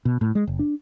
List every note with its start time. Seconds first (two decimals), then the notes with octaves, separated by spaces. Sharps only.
0.05 B2
0.21 A2
0.35 G#3
0.47 F#1
0.59 D4